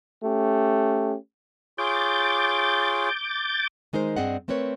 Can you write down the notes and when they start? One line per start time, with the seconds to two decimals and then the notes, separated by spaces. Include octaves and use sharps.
0.23 A3 C#4 G4
1.78 F4 G#4 C#5 D6 G6 A6
3.93 D#3 G#3 D#4 A#4 C5
4.16 G2 C4 G#4 D5 D#5 F#5
4.48 A3 C4 A#4 B4 C#5